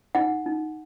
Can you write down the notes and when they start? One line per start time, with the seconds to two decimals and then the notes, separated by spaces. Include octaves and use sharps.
0.15 D#4 F#5
0.46 D#4